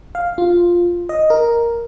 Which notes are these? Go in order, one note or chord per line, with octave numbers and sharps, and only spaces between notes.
F5
F4
D#5
A#4